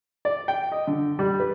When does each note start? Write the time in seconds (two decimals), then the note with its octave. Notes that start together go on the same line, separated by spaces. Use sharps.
0.25 D5
0.48 G5
0.72 D#5
0.87 D3
1.19 G3
1.40 B4